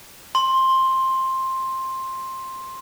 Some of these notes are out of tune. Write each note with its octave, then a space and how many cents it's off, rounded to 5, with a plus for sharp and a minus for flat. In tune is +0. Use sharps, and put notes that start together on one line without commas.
C6 +10